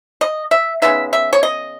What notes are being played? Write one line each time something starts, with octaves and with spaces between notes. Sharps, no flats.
D#5
E5
C#3 G#3 B3 D#4 E5
E5
C#5
D#5